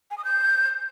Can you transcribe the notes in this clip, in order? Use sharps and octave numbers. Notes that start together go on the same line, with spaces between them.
G#5
D#6
G6